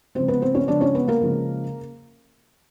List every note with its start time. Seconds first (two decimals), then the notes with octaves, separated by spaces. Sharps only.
0.15 C#3 F3 G#3 C4 C5
0.28 B3 B4
0.42 C4 C5
0.55 C#4 C#5
0.68 C#3 F3 G#3 D4 D5
0.81 C#4 C#5
0.95 B3 B4
1.08 A#3 A#4
1.22 C#3 F3 G#3